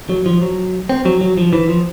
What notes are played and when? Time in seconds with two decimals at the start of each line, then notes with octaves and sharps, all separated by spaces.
0.10 F#3
0.26 F3
0.41 F#3
0.89 C4
1.05 F#3
1.21 F#3
1.37 F3
1.53 E3
1.69 F3